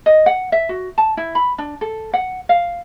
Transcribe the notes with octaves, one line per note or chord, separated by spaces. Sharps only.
D#5
F#5
E5
F#4
A5
E4
B5
D4
A4
F#5
F5